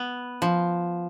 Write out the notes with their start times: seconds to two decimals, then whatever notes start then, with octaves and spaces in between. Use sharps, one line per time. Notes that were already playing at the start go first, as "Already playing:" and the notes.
Already playing: B3
0.42 F3